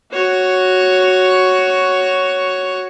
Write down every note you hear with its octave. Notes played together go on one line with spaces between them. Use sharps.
F#4 C#5